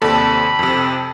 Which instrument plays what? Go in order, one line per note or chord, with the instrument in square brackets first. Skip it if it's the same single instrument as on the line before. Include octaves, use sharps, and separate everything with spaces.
[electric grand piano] D#2 C3 D5 [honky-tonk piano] A4 [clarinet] B5
[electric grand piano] F2 C3